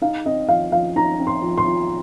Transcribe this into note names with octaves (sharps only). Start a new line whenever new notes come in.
D#4 F5
C4 D#5
F3 F5
F3 F5
D#4 A#5
C4
C6
F3
C6
F3